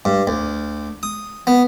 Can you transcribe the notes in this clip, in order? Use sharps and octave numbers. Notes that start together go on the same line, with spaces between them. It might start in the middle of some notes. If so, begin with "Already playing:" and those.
G2
D2
D#6
B3